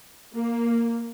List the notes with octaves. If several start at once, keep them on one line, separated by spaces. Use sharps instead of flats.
A#3